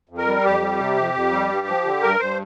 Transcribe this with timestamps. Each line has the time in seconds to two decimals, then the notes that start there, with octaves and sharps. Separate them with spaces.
0.09 F2
0.18 A#4
0.27 G3
0.45 F2 G4
0.61 G3
0.80 C3
0.97 F2
1.14 F2
1.32 G3
1.49 G2
1.67 F3
1.85 D3
2.02 G2 A#4
2.20 G2 C5